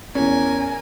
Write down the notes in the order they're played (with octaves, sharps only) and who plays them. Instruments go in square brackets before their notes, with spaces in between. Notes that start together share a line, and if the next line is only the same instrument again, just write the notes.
[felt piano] E2 C#4 [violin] A#4 G#5